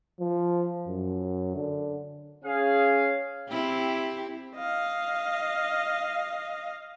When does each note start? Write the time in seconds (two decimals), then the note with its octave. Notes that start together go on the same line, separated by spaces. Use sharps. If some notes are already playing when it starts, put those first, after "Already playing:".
0.20 F3
0.87 F#2
1.56 D3
2.45 C#4 G#4 F5
3.48 C4 E4 G4
4.55 D#5 F5